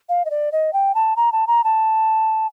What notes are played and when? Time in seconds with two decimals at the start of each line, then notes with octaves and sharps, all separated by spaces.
0.09 F5
0.25 D#5
0.30 D5
0.52 D#5
0.73 G5
0.95 A5
1.16 A#5
1.32 A5
1.47 A#5
1.64 A5